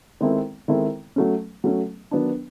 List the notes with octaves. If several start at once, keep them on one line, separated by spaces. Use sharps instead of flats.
D#3 G#3 C4 E4 A4
D#3 G#3 C4 E4 A4
F#3 A3 C#4
F#3 A3 C#4
D#3 F#3 B3 D4